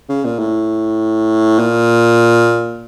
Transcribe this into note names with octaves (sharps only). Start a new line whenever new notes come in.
C#3
A#2
A2
A#2